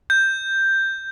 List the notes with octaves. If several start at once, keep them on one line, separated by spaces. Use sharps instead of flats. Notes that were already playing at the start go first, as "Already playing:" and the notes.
G6